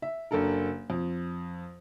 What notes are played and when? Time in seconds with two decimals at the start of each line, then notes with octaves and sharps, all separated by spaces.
0.02 E5
0.31 F#1 D4 A4 A#4
0.90 F2